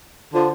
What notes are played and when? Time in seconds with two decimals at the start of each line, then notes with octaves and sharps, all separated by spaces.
0.34 D3 F3